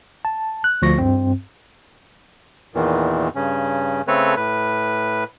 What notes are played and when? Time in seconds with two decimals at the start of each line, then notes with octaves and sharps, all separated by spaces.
0.25 A5
0.64 F#6
0.82 D2 F3 C#6 A#6
0.98 G2 C4
2.75 E2 A#2 D#3 E3
3.35 G2 C#3 C#4
4.08 C#3 A3 C4 A4 B4 C#5
4.37 A2 B4